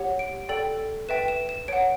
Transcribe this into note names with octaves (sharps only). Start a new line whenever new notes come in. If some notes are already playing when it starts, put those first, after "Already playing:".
Already playing: G4 C#5 F#5
D7
A4 D5 G5 F#7
B4 E5 G5 E7
E7
E7
C#5 F#5 D7